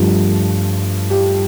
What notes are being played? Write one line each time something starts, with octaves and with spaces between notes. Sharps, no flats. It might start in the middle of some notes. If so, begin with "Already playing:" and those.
Already playing: G2 F3 A3
G4